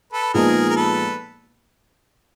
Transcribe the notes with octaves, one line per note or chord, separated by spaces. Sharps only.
A4 B4
A#2 F3 G#3 B3 D#4 G#4 A#4
A#4
A4 B4